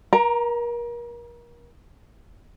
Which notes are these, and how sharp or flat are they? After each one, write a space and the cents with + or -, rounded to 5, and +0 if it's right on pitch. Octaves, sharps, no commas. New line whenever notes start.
A#4 +35 A#5 +0